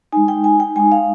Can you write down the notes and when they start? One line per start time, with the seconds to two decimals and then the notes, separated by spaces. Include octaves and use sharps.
0.12 G#3 D#4 G#5
0.28 G5
0.44 G#5
0.60 G5
0.76 G#3 D#4 G#5
0.92 F5